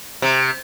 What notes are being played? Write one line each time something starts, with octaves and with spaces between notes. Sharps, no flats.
C3